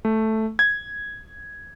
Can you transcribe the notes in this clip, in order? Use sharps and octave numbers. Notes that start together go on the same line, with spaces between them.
A3
G#6